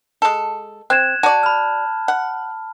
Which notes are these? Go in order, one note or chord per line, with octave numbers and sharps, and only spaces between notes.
G#3 A4
C4 F#6 G#6 E7
F#4 D5 A5
B5 F6
F#5